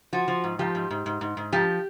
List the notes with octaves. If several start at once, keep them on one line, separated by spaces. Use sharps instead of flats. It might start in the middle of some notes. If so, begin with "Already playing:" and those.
F3 F#4
F3
G#2
F3 G4
G#2
G#2
G#2
G#2
G#2
F3 G4